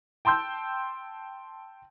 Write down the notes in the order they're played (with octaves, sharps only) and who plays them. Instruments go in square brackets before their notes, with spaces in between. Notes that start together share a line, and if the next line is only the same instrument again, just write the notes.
[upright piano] G5 A5 C6 E6 G6